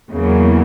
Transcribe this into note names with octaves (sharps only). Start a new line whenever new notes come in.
E2 C#3 F#3 A#3